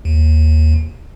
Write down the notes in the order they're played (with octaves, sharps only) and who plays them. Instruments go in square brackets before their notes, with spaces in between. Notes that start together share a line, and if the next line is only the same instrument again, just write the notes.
[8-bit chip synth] D#2